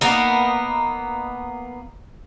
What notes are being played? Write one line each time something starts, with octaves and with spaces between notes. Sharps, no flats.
A#3 B3 D#4